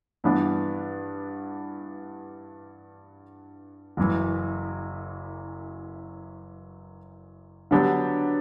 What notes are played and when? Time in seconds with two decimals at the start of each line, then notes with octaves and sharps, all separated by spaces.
0.24 G2 E3 B3 D4
3.97 F#1 F#2 E3
7.71 D3 F#3 B3 D4 G4